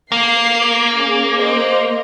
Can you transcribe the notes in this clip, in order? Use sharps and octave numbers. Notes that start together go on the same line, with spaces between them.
A#3 C7
C#4 G#4
C5 D#5